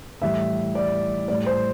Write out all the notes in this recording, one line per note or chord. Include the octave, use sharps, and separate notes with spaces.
A2 E3 G3 E5
D5
A2 G3 D5
C5